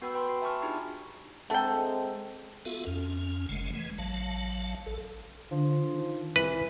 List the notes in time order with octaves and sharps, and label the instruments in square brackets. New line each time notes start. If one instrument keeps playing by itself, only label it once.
[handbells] B3 F#4 B4 G5 B5 E6
B4 G5 B5 C6
F#4
E5 G#5 A5 B5 C#6 F6
D4 D#4 F4 G4 G#4 A#5
[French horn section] G#3 C4 [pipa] A3 G5 [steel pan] A4 F#5 [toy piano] A5 A#5
[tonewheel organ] B3 F4 F#4 A4 E5 F5
F2 C#4
F#1 C#3 G#3 A3
E3 G#3
A1 F#3 F5 A5
A1 A4
[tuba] D3 [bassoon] F3
[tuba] D#3
[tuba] C2 [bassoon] E3 [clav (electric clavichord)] B4